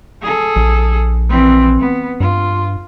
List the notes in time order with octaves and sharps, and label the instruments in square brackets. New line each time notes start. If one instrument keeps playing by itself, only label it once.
[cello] G#4 A4
[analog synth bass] A#1
[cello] E3 C4
B3
[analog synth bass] G2 [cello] F4